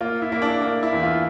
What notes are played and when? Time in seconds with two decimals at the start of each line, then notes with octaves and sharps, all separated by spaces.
0.01 A#3 F4
0.22 E4
0.32 A#3
0.42 D4
0.61 A#3 D4
0.83 E4
0.93 E2
1.03 F4